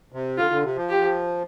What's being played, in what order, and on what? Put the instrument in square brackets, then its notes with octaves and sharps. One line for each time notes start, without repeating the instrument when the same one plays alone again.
[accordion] C3
[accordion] D3 [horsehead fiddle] F4
[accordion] D3
C3
F3
[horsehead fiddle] G4